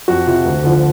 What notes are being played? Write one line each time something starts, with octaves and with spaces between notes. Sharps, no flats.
F2 F#4
C3 F3
D2
D3 F3